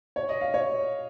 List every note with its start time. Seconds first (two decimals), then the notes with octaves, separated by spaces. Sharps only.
0.16 C#5
0.29 D#5
0.41 F5
0.54 C#5